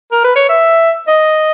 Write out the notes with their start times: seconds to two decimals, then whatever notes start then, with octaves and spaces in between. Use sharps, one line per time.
0.11 A#4
0.24 B4
0.36 C#5
0.49 E5
1.08 D#5